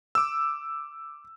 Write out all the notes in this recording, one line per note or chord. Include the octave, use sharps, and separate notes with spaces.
D6 E6